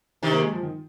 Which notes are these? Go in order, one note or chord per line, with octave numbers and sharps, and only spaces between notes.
C3 D#3
A#3
G#3
F3
D#3